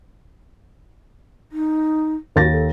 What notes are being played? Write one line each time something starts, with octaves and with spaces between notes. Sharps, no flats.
D#4
D#2 F#4 A6 A#6
A4